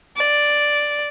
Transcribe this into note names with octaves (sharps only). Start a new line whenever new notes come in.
D5